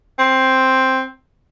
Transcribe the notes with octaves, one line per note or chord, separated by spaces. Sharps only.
C4